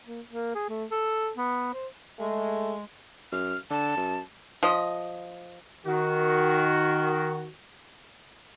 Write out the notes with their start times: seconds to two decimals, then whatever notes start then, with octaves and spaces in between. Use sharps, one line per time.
0.06 A#3
0.29 A#3
0.55 G#4
0.69 A3
0.91 A4
1.37 B3
1.73 C5
2.19 G#3 A3
3.32 F#2 F6
3.71 D3 A5
3.97 F#2
4.63 F3 D#5
5.86 D#3 F#4